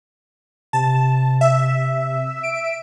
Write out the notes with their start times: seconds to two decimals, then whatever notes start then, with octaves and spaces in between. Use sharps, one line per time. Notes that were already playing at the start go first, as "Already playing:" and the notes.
0.73 C3 A5
1.41 E5
2.43 D7